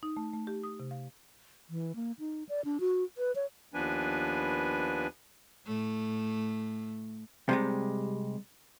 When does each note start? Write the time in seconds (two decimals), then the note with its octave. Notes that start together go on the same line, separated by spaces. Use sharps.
0.03 D#4
0.17 A3
0.33 A3
0.47 G4
0.63 D#6
0.80 C3
0.91 F5
1.70 E3
1.96 A#3
2.19 D#4
2.49 D5
2.65 D4
2.80 F#4
3.18 B4
3.36 C#5
3.74 D#2 F3 B3 D4 B4 G#5
5.66 A2 A3
7.49 C3 G3 G#3